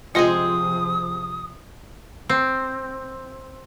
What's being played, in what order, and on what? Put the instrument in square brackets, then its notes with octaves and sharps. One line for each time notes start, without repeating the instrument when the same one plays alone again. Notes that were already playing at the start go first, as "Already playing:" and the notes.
[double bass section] C3 F3 [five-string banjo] G#3 C4 G#4 [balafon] F4 D#5 [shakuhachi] D#6
[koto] C4